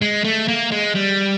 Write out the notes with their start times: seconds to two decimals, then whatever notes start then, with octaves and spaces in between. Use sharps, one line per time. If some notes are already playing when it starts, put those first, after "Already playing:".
0.02 G#3
0.24 A3
0.48 A#3
0.72 G#3
0.95 G3